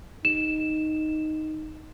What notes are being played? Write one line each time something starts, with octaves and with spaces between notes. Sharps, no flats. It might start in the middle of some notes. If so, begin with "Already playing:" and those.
D#4 E7